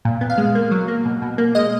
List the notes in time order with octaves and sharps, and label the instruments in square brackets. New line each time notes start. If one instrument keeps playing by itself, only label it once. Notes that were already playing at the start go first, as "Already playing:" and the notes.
[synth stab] A#2
B3
F5
G#3
A#3
F#3
A#3
B2
B2
A#3
G#3 D#5